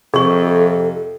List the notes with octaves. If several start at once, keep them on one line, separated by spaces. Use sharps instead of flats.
F2 C3 G#4 A4 C#6